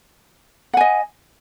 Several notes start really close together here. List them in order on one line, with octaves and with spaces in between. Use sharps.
F#5 G#5 D#5